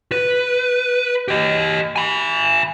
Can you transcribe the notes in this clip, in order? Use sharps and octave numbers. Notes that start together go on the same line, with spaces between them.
B4
G4 D#5
G#5 B5